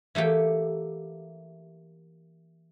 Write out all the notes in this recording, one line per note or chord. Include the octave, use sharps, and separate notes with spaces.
E3 A3 A#3 G4